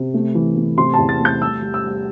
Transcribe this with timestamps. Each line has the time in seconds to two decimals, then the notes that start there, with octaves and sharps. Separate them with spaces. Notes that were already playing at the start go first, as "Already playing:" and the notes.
Already playing: C3
0.14 A3
0.35 E3
0.56 A3
0.78 C3 C6
0.94 A5
0.99 E2
1.09 A6
1.21 A3 G6
1.41 G3 E6
1.62 G3
1.74 E6
1.84 G3